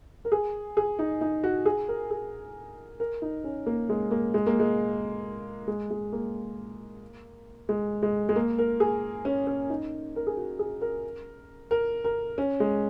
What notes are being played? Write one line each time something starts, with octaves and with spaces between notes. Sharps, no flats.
A#4
G#4
G#4
D#4
D#4
F#4
G#4
A#4
G#4
A#4
D#4
C#4
A#3
G#3
A#3
G#3
A#3
G#3
G#3
G#3
A#3
G#3
G#3
G#3
A#3
A#4
G#4
C#4
C#4
D#4
A#4
G#4
F#4
G#4
A#4
A#4
A#4
C#4
G#3